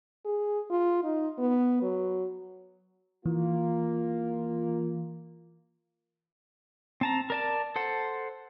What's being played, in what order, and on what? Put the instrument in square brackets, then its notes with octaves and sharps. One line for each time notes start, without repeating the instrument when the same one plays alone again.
[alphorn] G#4
F4
D#4
B3
F#3
[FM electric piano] E3 [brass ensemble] A#3 F4
[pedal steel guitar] C4 A5 A#5
A#4 D5 A5
A4 C5 F#5